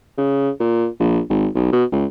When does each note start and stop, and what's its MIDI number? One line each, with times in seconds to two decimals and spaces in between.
0.17 0.50 49
0.60 0.87 46
1.00 1.20 34
1.29 1.47 32
1.55 1.67 35
1.72 1.84 47
1.92 2.05 37